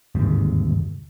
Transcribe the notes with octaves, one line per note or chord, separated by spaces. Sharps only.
G1 D#2 G#2 C3